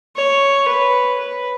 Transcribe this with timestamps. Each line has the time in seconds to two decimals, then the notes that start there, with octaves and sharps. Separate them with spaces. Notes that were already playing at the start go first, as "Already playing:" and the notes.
0.17 C#5
0.68 B4
1.19 B4